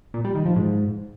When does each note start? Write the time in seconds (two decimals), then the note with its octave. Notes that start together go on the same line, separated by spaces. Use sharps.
0.14 A#2
0.24 G3
0.35 D#3
0.45 F3
0.56 G#2